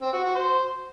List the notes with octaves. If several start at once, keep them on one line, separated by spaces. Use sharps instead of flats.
C4
F#4
F#4
C5